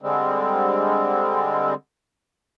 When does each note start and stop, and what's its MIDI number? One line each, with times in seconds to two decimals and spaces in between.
0.01 1.74 50
0.01 1.74 55
0.01 1.74 56
0.01 1.74 60